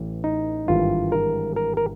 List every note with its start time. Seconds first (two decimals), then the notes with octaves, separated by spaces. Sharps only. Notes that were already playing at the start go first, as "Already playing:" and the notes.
Already playing: A1 E3
0.24 D#4
0.68 G#1 G2 E3 F4
1.12 A#4
1.56 A#4
1.77 A#4